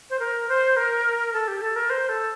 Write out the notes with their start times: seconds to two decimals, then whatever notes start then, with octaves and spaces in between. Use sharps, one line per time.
0.10 C5
0.19 A#4
0.49 C5
0.77 A#4
1.33 A4
1.48 G4
1.61 A4
1.76 A#4
1.90 C5
2.09 A4